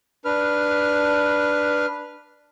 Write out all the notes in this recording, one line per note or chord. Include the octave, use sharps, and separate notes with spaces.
D4 B4 F6